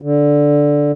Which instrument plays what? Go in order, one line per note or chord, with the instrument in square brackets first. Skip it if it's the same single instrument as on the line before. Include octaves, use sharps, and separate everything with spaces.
[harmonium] D3